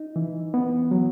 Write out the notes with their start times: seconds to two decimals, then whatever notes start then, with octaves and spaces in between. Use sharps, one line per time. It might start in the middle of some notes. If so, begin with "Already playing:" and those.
Already playing: D#4
0.16 E3
0.54 B3
0.91 F#3